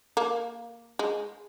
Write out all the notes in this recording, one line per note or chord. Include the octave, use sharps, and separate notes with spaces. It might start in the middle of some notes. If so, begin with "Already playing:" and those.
A#3
G#3